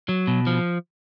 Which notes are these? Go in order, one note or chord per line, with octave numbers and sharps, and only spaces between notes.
F#3
B2
F3